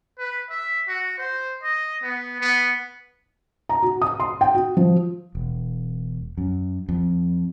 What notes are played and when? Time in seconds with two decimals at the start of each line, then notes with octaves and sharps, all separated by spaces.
0.19 B4
0.50 E5
0.88 F#4
1.18 C5
1.63 D#5
2.02 B3
2.41 B3
3.69 A#5
3.82 F#4
4.02 D#6
4.20 C6
4.41 G5
4.55 F#4
4.77 F3
5.35 E1
6.38 F#2
6.89 F2